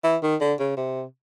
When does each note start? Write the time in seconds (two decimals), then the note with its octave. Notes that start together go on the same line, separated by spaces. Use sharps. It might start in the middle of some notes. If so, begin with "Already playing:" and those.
0.04 E3
0.22 D#3
0.41 D3
0.59 C#3
0.77 C3